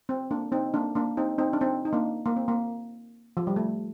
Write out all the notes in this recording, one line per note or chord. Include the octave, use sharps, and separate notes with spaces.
C4
A#3 D4
C4 D#4
A#3 D4
A#3 D4
C4 D#4
C4 D#4
D4
C4 D#4
D#4
A#3 D4
A#3
C4
A#3
F3
G3
A3